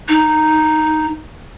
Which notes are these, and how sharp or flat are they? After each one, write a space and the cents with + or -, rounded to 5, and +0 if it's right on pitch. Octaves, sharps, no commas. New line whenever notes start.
D#4 -5